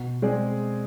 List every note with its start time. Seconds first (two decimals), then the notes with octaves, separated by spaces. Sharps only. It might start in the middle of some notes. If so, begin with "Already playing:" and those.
Already playing: B2
0.22 G#3 C4 G#4 D5